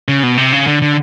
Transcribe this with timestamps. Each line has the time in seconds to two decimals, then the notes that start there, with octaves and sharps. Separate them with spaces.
0.08 C#3
0.23 B2
0.38 C3
0.52 C#3
0.67 D3
0.82 D3